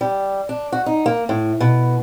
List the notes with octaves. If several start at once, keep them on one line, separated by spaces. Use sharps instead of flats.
G3
D4
F#4
D#4
A#3
A2
B2